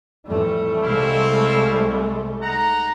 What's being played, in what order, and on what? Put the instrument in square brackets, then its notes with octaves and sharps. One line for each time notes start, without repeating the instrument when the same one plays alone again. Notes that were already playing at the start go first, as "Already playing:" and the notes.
[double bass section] F2 A2 E3 [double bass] G3 A3
[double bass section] C2 G#3 [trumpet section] C4 E4 F5
[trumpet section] D#4 F#5 A#5